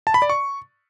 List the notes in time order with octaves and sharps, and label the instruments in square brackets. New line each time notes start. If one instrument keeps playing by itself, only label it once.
[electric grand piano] A5
B5
D5
C#6